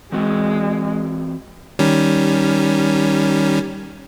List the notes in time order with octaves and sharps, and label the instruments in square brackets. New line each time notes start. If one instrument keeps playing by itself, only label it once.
[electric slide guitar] E3 C4 F#4 [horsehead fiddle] G#3
[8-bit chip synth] D#3 G3 C#4